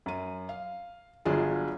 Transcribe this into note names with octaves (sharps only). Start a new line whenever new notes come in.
F#2 D#7
F5
G1 F#3 D4 F4 G#4